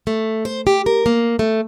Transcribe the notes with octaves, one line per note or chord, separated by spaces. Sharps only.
A3
C5
G4
A#4
A#3
A3